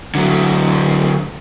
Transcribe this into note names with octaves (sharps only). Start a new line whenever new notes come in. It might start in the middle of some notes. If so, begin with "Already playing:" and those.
D3 F#3